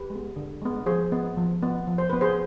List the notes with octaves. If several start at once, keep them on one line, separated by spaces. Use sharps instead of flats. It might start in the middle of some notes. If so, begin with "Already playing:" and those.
Already playing: G4 B4
G#3
B3
D3
G#3 B3
F3 G#4 C5
B3
F3
B3
F3
C5
B3 B4
G#4 C5